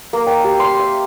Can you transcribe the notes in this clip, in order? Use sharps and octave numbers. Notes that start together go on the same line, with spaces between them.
A#3
G5
G4
C6
E5